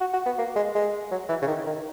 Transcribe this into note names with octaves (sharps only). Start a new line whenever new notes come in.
F#4
F#4
B3
A#3
G#3
G#3
F#3
E3
C#3
D#3
D#3